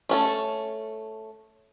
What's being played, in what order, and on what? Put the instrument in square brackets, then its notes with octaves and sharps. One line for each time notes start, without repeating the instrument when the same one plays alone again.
[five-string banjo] A3 C#4 A4